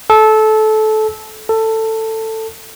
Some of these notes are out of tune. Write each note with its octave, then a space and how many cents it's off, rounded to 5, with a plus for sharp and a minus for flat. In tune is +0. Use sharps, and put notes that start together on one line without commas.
A4 -20
A4 +15